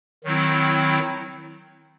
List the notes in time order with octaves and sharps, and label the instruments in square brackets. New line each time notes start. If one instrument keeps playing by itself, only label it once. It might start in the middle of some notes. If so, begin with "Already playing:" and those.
[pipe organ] D#3 F#3 C4 E4